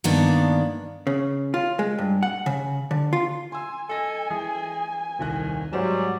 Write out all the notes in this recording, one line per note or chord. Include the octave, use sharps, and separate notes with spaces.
G2 D#3 A#3 B3 D4
C#3
F4
G#3
G2
F#5
C#3
D3
F4
G#5 C6 E6
A4 D#5 G#5 A#6
E3 G#4
D#1 C2 D#3 F#6
G#2 F#3 G3 C5 E7